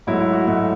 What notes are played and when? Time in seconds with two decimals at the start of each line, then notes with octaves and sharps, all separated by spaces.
0.07 G#2 F#3 A3 E4
0.21 E4
0.33 F#4
0.47 G#2 F#3 A3